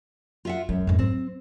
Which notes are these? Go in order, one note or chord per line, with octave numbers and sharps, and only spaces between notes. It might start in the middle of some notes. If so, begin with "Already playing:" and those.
F4 E5 F#5
F#2 G#3
F2 G#2
F#3 C4